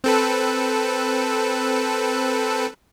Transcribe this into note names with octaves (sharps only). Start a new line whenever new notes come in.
C4 A4 B4